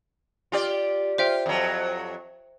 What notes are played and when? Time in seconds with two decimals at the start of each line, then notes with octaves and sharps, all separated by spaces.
0.52 F4 G4 D5
1.18 F4 C5 E5 G5
1.46 F2 F#3